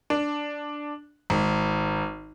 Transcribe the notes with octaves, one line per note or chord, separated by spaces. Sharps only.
D4
G#1